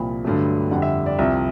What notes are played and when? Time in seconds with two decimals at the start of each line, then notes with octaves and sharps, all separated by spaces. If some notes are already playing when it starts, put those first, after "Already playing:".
Already playing: C2 A#2 F3 B5
0.24 G2 D3 F#3 A3
0.71 F2 D3 G3 F#5
0.82 E5
1.06 D5
1.19 C2 C3 F3 E5